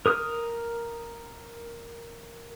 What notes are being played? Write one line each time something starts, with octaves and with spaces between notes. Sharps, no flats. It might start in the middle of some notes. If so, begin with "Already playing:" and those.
A#4 D#6 F6